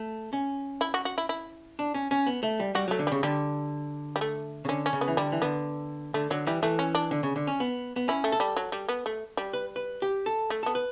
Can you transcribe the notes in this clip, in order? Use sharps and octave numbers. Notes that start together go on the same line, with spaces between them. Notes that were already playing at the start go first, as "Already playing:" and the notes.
Already playing: A3
C#4
E4
F#4
F#4
E4
E4
D4
C#4
C#4
B3
A3
G3
G3 F#4
F#3 A3
D3
C#3 G3
D3 G3
G3
A3
C#3
D3 C#4
C#4
C#3
B3
E3
D3 G3
E3
D3 B3
D3 A3
D3 F#3
E3 G3
E3 A3
C#4
D4
D3
C#3
D3
C#4
B3
B3
C#4 E4
A3
A4
G3
F#3
G3
B3
A3
G3
B4
B4
G4
A4
A3
B3 A4
B4